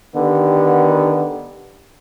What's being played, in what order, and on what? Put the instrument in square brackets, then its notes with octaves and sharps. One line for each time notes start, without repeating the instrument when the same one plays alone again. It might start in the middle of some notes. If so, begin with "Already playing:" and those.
[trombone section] D3 D#3 B3 G4